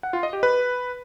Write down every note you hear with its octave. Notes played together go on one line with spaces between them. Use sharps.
F#5
F4
D#5
G4
B4